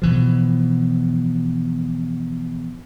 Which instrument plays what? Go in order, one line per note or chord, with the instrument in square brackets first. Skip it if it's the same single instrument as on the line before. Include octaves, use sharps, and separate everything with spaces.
[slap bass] B2 E3 F3